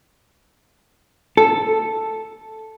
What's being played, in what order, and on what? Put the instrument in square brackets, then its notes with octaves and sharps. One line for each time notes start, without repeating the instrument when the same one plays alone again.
[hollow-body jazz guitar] A4